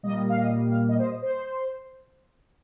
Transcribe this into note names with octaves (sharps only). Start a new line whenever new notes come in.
A#2 G3 A#3 D#5
F5
D#5
F5
D#5
C5
D#5
C5